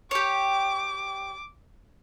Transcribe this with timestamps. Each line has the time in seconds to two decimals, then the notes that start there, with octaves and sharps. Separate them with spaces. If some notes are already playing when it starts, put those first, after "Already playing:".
0.11 G4 C#5 D6